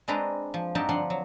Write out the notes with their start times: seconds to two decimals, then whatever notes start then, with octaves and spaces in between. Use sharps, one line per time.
0.08 G#3 C4 D4 B4 A#5
0.54 F3
0.75 G2 C4 D#4 F#4 G4 A5
0.89 D3 F3 D4 F#5 C6
1.10 F#3